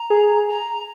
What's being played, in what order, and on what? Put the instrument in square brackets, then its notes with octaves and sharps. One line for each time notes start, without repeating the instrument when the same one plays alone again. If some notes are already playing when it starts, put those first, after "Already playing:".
Already playing: [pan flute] A#5
[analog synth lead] G#4
[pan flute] A#5